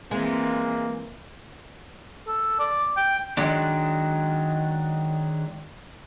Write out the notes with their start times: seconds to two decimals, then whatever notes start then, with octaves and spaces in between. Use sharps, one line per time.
0.11 E3 G#3 A#3 C4
2.28 A4
2.59 D5
2.97 G5
3.37 D#3 F#3 G#3 D4